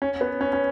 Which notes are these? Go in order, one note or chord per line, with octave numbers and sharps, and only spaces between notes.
C#4
B3
C#4
C#4